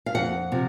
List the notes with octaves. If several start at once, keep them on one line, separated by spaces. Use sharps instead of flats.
F5
F2 F#5
C3 F3